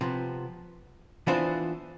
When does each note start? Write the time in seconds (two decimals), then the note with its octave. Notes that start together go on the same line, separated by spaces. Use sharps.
0.01 C3 F3 B3
1.27 E3 B3 D4 F4 C5